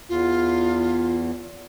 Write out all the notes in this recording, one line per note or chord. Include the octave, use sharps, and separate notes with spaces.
E2 F4